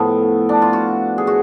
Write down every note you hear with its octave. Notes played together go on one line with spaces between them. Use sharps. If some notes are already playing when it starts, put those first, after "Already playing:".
Already playing: A2 F3 B3
D4
F4
F#4
G#4
F#4